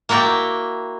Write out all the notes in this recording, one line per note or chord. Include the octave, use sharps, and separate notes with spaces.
A#3 E4 F#4 D5 G5